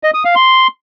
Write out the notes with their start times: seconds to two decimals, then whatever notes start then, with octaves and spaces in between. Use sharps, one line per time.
0.03 D#5
0.14 D#6
0.25 F5
0.35 C6